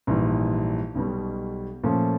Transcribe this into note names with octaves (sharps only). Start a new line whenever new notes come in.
A#1 G#2 E3 G3
B1 B2 G3
A#2 F3 A3 C#4